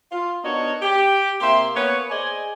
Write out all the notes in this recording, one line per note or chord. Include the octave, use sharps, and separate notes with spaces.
F4
B3 D4 D#4 F#4 A#4 C#5
G4
C3 A#3 G4 E5 C6
A#3 B3 B4 C#5
G#4 C5 D5 D#5 G#5